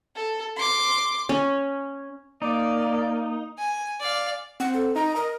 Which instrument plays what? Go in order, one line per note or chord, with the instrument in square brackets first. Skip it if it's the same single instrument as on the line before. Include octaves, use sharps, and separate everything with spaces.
[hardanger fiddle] A4
C6 D6
[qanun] C#4
[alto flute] A#3 [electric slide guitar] D#4 [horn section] D5
[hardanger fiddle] G#5
D5 F5
[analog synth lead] C4 [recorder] F#5
[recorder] A4
[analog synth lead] D#4 [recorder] A#5
[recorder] A#4 [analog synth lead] D#5